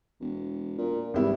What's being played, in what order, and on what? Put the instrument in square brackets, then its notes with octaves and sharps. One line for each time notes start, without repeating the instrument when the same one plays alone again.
[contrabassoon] E1
A#2
[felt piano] G#1 G3 E4 [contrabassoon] E2